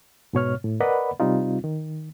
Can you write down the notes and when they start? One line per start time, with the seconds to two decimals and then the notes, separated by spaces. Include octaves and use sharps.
0.33 G#2 B2 C#5 F6
0.64 A2
0.80 A#4 B4 D5 D#5 F#5 B5
1.20 C3 G3 C4 D#4 F4
1.64 D#3